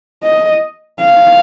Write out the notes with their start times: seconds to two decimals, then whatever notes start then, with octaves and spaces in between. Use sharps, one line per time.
0.23 D#5
1.00 F5